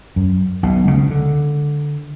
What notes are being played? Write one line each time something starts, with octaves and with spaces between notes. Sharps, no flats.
F#2
B1 B2
C#2 C#3
D3